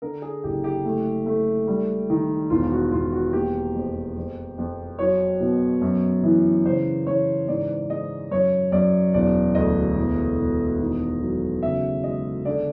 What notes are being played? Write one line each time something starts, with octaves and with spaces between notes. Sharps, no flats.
D3 A#4
G#4
F#1 G4
G4
A3
A3
G3
D#3
E1 F4
F#4
E1 F4
F#4
A#3 G4
F2
F2
F2
F#3 C#5
B2
F#2
E3
C#3 C5
E3 C#5
G#2 D5
G#3 D#5
F#2 C#5
F#2 D5
E1 D5
D2 D#5
E1
E1
D#3
F#3
C#3 E5
G#3 D#5
D3 D5